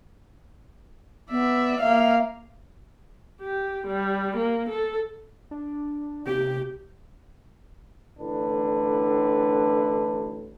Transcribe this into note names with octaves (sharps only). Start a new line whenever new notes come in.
B3 D5 E5
A#3 E5 F5
G4
G3
A#3
A4
D4
C3 G4
A1 A2 D3 D4 B4